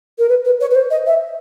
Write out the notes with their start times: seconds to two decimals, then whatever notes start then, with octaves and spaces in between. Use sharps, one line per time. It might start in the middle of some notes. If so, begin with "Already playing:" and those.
0.18 A#4
0.29 B4
0.45 B4
0.61 C#5
0.71 B4
0.75 C5
0.91 D#5
1.07 E5